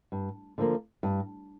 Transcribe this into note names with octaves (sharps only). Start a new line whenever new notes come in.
G2
D3 F3 A#3
G2